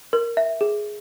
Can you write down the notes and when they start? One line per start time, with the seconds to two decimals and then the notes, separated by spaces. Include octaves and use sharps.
0.13 A#4
0.37 E5
0.61 G#4